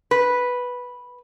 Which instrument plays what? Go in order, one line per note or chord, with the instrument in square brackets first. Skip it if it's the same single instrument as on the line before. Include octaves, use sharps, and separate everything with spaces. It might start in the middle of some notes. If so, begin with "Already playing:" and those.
[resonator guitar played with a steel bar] B4